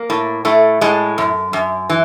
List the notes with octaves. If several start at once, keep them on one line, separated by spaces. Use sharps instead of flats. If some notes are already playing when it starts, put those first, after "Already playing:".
Already playing: A#3
A2
A2 A3
A2 G#3
F#2
F#2
E3